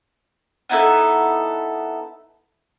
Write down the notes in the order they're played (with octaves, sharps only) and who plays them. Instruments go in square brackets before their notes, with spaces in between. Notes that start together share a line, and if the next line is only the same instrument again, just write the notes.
[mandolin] B3 D#4 E4 A4